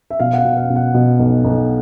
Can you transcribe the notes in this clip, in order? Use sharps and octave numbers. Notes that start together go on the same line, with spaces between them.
E5
B2 F5
F#5
F5
B2
F5
B2
F#5
B2
B1
B1